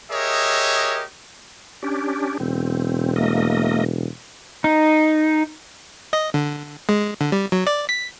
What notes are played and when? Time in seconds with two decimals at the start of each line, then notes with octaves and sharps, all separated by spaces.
0.11 G4 G#4 A#4 C#5 D#5 E5
1.83 C#4 D4 G4
2.40 E1 C4
3.16 A3 A#3 D#5
4.64 D#4
6.13 D#5
6.34 D3
6.89 G#3
7.21 D3
7.32 G3
7.52 F#3
7.67 D5
7.89 B6